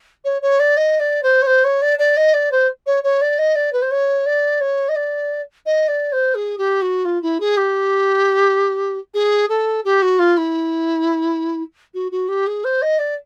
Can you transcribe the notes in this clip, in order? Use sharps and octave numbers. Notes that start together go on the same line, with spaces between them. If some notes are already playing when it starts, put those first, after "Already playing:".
C#5
C#5
D5
D#5
D5
C5
C#5
C5
C#5
D5
D5
D#5
D5
C5
C#5
C#5
D5
D#5
D5
B4
C5
C#5
D5
C#5
D#5
D5
D#5
D5
C5
G#4
G4
F#4
F4
E4
G#4
G4
G#4
A4
G4
F#4
F4
E4
F#4
F#4
G4
G#4
C5
D#5
D5